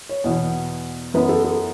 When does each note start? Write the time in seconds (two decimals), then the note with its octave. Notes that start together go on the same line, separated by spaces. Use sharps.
0.09 C#5
0.24 E2 B2 B3
1.14 F#2 E3 B3 B4
1.29 A4
1.44 A4